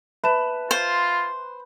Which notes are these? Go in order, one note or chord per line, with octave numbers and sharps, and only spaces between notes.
B4 E5 A5 E7
F4 C5